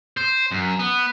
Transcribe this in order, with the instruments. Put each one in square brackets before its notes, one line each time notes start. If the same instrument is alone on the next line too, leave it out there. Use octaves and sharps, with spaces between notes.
[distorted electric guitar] C5
F#2
B3